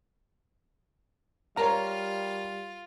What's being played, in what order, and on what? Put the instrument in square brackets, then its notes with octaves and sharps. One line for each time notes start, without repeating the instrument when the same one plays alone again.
[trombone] G3 [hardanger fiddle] F4 [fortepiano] A#4 C#5 [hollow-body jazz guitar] A#5